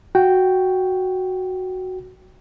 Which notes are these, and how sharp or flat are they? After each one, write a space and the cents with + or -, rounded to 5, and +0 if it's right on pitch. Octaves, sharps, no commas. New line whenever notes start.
F#4 +0 G5 -5